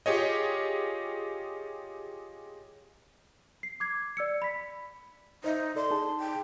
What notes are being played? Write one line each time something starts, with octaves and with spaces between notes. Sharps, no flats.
F4 G4 G#4 C#5 D#5
C7
D6 G#6 C7
D5 E6 C#7
B5 B6
D#4 C5 D#5 E5
A4 D5 C6
D#4 G#4 A5
G5